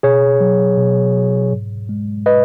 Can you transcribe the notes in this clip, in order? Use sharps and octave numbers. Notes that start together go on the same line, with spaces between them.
B2 G#4 C#5
F#3
B2
F#3
G#2
G#3
B4 D#5